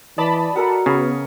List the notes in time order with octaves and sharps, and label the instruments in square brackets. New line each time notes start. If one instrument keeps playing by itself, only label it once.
[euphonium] E3 [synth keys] D5 A5 B5 [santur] D#5
[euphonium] F#4 [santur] A4 A#4 F#5
[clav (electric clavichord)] C#3 [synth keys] B3 [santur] G#5